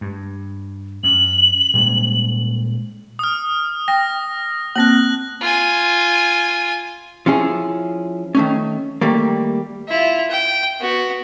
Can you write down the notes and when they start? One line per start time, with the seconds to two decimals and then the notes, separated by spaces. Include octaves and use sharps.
0.01 G2
1.03 F#2 F#7
1.74 A#2 G3 G#3
3.19 D#6 F6
3.88 G5 A#6
4.76 A#3 C4 F#6 A#6 F#7
5.40 F4 G#5
7.26 F3 C#4 E4 G#4
8.35 D#3 A3 C#4
9.01 D#3 G3 A3 A#3
9.88 E4 F4
10.30 G5
10.79 B3 F#4